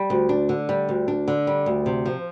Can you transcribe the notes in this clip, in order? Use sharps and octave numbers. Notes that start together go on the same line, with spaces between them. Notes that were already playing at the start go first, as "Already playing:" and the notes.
Already playing: G3
D2
D4
D3
G3
D2
D4
D3
G3
D2
C3
F3